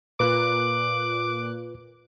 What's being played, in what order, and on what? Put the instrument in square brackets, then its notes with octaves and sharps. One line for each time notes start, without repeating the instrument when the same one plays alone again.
[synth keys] A#2 F#6 [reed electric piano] F4 B4 [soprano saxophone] D6